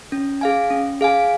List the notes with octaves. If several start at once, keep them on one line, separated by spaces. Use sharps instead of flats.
C#4
G#4 F5 G#5
C#4
G#4 F5 G#5